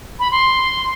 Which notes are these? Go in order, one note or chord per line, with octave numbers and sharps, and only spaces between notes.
B5
C6